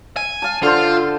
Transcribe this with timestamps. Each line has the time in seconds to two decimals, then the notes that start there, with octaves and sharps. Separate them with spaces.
0.17 G#5
0.42 F5 A5
0.63 D3 F4 A4 C5